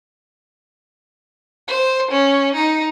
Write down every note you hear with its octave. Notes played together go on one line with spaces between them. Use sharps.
C5
C#4
D#4